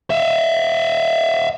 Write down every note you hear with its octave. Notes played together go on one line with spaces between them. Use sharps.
E5 F5